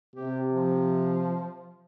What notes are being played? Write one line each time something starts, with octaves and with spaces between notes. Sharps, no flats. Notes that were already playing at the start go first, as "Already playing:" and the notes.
C3 G4
F3